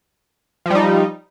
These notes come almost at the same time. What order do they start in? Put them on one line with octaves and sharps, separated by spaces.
F3 G3 D#4